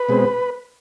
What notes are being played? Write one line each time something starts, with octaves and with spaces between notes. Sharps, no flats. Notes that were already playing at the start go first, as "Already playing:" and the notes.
Already playing: B4
B2 G#3 C4